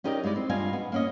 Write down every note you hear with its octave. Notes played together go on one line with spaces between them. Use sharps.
C#4 D#4 G4 A#4 D5 D#5
G2 G#3 E4 D5
C4
G2 F4 D5 D#5 F5 G#5
B3
A#3 C#4 D#5